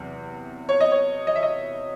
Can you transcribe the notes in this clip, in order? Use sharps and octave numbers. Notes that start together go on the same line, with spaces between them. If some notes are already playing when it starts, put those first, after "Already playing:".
Already playing: E2 C3 F#3
C#5
D#5
C#5
D#5
E5
D#5